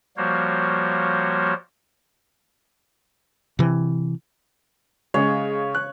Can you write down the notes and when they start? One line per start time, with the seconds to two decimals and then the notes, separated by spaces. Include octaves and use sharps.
0.17 F3 G3 A#3 F#4 C5 C#5
3.59 C3 E3
5.14 C#3 G#3 C#5
5.75 F#6